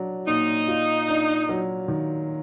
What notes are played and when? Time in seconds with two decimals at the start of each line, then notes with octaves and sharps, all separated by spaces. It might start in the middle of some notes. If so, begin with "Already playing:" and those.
Already playing: F#3 D4
0.27 A#2 D#4
0.68 F4
1.08 D4
1.49 F#3
1.88 D#3